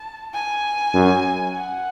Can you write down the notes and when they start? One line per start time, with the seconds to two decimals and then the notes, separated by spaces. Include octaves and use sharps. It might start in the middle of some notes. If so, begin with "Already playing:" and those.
Already playing: A5
0.34 G#5
0.94 F#2
1.54 F#5